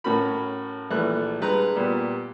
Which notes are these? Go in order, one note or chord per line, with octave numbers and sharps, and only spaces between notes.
A2 C#4 F#4 A#4 B5
A#1 E3 A3 F#6
G2 G#3 B4 A#5 F#6
A#2 G3 B3